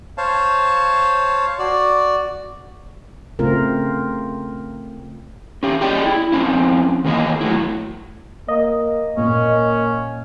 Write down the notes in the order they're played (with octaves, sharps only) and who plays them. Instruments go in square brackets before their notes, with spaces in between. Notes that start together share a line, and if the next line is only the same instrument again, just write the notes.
[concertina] C5 C#5 F5 A5
F#4 D5
[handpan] C#3 A3 C4 F4 A#4
[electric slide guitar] C#4 G4
G4 G#4 D5 D#5 G5
E4
F2 C4 C#4 E4
D#3 E3 A#3 G#4 D#5
F#3 A3 E4
[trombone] A#3 [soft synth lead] D#5
[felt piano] A#2 [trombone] A#3 [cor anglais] C#4